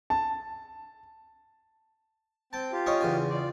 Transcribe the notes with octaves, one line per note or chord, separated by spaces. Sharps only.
A5
C4 G5 A5
F4 G4
C#4 C#5 D#5
E2 C#3 G#5
F4 D5